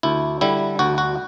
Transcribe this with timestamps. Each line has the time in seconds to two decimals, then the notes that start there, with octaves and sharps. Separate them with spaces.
0.03 D2 E4
0.41 D3 G3 E4
0.79 D2 F#4
0.98 F#4